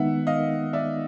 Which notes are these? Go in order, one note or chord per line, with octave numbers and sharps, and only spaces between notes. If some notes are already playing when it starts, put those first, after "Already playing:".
Already playing: D#3 G#3 B3 D#4 E5 F#5
D#5 F5
D5 E5